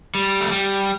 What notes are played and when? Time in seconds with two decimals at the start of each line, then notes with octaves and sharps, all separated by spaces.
0.15 G3
0.41 A3
0.51 G3